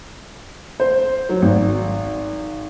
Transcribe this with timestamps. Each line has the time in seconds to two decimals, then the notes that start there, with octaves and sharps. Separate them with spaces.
0.80 C5
1.29 F#3
1.42 G#1